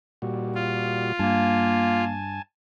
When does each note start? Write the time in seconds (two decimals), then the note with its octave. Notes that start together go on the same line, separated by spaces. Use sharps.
0.22 A#2 G3 F#4
0.55 F4
1.19 G2 A#3 G#5 A5